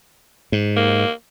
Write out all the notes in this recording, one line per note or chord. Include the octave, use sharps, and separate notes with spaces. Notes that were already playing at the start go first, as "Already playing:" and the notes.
G#2
A#3